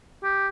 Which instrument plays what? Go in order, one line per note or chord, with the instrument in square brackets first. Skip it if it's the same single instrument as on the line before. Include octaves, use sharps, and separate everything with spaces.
[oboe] G4